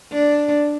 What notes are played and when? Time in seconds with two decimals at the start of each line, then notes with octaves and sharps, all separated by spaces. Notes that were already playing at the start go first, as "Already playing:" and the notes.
0.12 D4